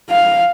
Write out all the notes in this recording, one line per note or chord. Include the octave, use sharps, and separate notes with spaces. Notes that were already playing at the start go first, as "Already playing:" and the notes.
F5